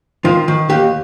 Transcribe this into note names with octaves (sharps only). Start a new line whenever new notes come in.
D#3 F4
D#3
D#2 G4